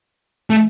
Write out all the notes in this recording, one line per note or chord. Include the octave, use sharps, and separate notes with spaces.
A3